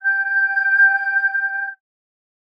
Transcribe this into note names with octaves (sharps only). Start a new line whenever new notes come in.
G5 G6